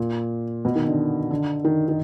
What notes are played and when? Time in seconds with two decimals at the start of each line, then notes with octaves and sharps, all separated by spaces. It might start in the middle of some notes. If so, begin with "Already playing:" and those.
Already playing: A#2
0.65 B2
0.76 D#3
0.87 D3
1.31 D3
1.64 D#3
1.88 D#3